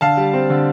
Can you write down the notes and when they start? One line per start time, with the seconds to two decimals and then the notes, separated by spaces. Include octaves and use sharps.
0.01 D3 F5 A5
0.17 G3
0.33 C4
0.50 D3